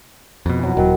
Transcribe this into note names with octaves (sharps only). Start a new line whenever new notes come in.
F2 B2
E3 F#3
D#1 D#3 F#3